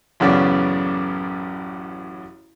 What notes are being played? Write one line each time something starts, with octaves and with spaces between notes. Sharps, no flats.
A1 F#2 C#3 B3 D5